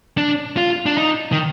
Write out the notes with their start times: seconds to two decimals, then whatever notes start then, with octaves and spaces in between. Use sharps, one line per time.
0.17 D4
0.57 F4
0.86 D4
0.98 D#4
1.32 D#3